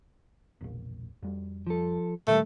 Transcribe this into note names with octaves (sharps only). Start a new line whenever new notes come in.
E1 A#1
F2 G3
F3 A4
A#2 D#3 G3 A3